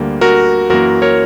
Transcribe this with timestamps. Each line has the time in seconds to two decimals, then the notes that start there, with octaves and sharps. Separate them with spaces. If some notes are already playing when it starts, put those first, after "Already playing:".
Already playing: D2 D3 G3 A#3
0.21 F#4 A#4
0.70 F#2 E3 A#3 F#4 A#4
1.02 A#4 C#5